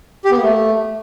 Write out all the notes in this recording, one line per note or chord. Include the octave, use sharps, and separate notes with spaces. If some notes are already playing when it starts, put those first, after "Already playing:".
G4
B3
A#3
A3